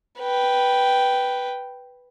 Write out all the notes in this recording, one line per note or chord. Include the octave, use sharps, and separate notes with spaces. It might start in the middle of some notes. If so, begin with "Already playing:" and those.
B4 G5